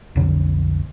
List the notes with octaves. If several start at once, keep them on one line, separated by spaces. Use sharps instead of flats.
B1 F2 D3 C#4